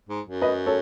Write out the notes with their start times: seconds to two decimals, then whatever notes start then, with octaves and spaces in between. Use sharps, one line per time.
0.09 G#2
0.26 F#2
0.42 B4 D#5
0.66 A4 C#5